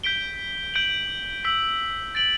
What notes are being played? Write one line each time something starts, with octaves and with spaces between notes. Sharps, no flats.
G6 B6 D7 G7
G6 D7 F#7
E6 B6 F#7
A6 D7 F#7